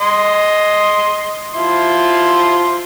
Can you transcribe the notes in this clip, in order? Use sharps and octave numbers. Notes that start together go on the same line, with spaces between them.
D#5 C6
F3 E4 C6